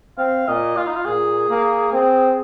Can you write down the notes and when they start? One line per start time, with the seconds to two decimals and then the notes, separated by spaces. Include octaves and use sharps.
0.18 C4 F5
0.48 A#2 D#5
0.77 F4
0.87 D#4
0.96 F4
1.05 A#2 G#4
1.50 A#3
1.93 C4